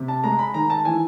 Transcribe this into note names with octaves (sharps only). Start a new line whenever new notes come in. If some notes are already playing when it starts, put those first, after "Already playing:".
Already playing: C3
A5
G#3 A#5
B5
D#3 A#5
A5
E3 G#5